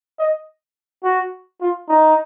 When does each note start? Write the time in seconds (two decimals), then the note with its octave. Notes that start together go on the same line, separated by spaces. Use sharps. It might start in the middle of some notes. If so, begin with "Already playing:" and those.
0.19 D#5
1.04 F#4
1.61 F4
1.89 D#4